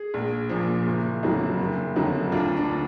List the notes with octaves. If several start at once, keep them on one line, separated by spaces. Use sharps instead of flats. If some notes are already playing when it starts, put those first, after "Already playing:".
Already playing: G#4
A#1
A#2 F3
F#1
F2 D3 F#3
F#1
F2 D3 F#3
D2 D4 F4
D4
D3